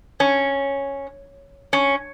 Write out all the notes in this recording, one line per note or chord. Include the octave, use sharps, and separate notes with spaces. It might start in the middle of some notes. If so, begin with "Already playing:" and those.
C#4
C#4